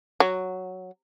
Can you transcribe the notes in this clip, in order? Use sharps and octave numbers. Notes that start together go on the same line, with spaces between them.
F#3